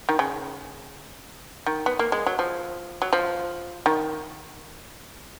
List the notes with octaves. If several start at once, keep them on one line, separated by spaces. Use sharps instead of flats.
D#3
C#3
D#3
B3
A#3
G#3
F#3
F3
F#3
F3
D#3